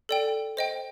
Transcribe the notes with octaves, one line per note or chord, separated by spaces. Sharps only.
A4 D5 G5
C5 D#5 G5